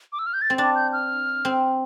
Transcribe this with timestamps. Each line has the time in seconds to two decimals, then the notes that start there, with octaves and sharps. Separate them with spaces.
0.13 D6
0.19 E6
0.26 F6
0.34 G6
0.42 A6
0.50 C4
0.58 D4 A6
0.75 G6
0.93 F6
1.45 C4